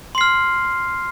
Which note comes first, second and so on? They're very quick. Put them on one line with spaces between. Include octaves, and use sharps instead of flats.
C6 C7 F6